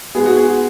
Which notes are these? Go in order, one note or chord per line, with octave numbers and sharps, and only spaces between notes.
G#2 G#3 B3 G#4
F#4
G#4